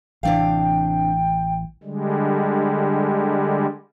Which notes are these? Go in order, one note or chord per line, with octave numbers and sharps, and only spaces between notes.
A1 C3 E3 D4 F5 G5
D3 G3 G#3